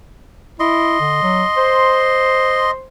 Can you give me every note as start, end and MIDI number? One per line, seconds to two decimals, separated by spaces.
0.60 0.96 64
0.60 2.71 75
0.60 2.71 84
1.00 1.20 50
1.23 1.44 54
1.57 2.87 72